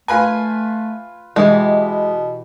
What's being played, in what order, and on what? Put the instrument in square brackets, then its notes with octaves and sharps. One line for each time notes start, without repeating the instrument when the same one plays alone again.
[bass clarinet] A3 [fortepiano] F4 B4 G#5
[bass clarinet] B2 [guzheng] E3 G4 [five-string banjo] G#3